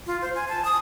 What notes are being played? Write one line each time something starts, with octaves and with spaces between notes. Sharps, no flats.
F4
C5
G#5
A5
D#6